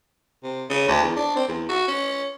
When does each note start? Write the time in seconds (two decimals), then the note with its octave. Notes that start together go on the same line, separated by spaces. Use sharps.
0.43 C3
0.70 C#3
0.88 D2
1.03 E2
1.17 D4
1.36 C4
1.48 E2
1.69 F#4
1.88 C#4